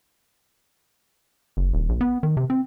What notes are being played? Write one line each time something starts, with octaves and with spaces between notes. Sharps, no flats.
F#1
D#1
A#1
B3
D#3
C3
C4